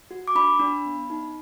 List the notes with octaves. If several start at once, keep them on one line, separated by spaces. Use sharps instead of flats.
F#4
D6
D4 B5
D4
B3
D#4